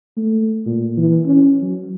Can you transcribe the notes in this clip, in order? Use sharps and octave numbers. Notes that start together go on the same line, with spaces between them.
A3
A#2
E3
C#4
F#3